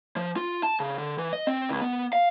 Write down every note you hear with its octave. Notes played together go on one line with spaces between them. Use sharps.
F3
F4
A5
C#3
D3
E3
D#5
C4
C#2
B3
F5